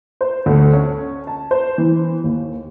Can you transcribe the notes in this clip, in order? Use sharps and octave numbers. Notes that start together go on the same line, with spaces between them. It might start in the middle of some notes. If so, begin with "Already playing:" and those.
C5
D2
C#4
A5
C5
E3
D#2